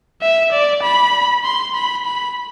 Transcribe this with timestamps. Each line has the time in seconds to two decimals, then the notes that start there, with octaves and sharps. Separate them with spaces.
0.22 E5
0.52 D5
0.83 B5
1.45 C6
1.75 B5
2.06 B5